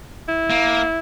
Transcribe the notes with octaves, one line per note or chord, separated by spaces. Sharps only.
E4
A#3